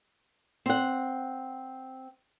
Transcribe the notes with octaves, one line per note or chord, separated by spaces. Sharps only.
C4 F#5